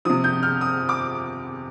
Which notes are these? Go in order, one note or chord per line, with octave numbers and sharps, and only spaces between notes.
C3 F3 D#6
G6
F6
D#6
D6